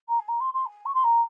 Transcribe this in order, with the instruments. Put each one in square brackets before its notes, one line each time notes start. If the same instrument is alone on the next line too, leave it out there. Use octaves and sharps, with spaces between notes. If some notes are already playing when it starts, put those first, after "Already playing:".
[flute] A#5
G#5
A#5
C6
C6
G#5
C#6
C6
A#5